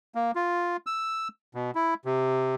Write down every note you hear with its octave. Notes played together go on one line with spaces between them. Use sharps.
A#3
F4
E6
B2
E4
C3